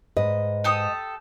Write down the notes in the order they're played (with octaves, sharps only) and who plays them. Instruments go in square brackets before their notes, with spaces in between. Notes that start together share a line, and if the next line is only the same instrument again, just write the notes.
[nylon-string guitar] G#2 B4 [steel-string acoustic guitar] D#5
[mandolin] G4 A4 D#6